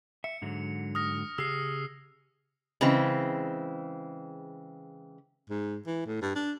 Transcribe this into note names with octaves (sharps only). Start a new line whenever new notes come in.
E5 C#7
G#2 D3 F#3
D#6 F6 A#6
C#3 G4 G#4 E6 C7
C#3 E3 G#3 C4
G#2
E3
A2
G2
D4